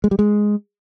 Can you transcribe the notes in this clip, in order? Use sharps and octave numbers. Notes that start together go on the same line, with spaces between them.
G#3
G3
G#3